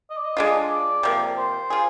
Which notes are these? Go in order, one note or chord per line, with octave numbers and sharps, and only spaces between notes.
D#5
D5
D#5
G#3 D4 F4
D5
C3 F3 A#3
C5
F4 G#4